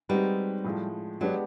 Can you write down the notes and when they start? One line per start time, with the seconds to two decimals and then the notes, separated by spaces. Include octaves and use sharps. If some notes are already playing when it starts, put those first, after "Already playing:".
0.09 G3 G#3 C4 D#4 F#4 B4
0.64 A2 F3 G#3
1.21 F#3 G#3 B3 D4 G4